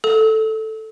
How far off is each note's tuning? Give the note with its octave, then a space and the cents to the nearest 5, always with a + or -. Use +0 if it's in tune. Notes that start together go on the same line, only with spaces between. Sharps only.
A4 +0 E6 -40